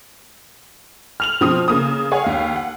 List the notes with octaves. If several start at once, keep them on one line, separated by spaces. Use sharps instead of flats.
F6 F7 F#7
B2 F3 C4 D#6
C#3 A#3 D#6
G#4 C#5 F#5 G#5
D#2 F5
F#5